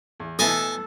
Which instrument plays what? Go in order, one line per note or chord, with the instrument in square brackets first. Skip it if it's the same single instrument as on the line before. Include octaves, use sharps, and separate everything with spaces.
[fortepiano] E2
[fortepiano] B2 E3 [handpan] A4 [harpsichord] D#5 G#5 A5